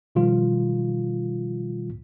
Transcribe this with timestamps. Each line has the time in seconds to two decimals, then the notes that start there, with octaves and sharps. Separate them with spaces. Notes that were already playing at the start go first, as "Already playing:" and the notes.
0.15 B2 D#3 F3 G3 F4